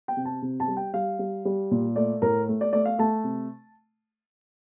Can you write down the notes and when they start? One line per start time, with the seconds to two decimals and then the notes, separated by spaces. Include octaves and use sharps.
0.08 G5
0.17 C3
0.25 A5
0.42 C3
0.60 A5
0.68 G3
0.77 G5
0.94 G3 F5
1.19 G3
1.45 G3
1.71 A#2
1.96 A3 D5
2.22 A2 A#4
2.48 A3
2.61 D5
2.73 A3 D5
2.85 F5
2.98 A3 A5
3.24 C3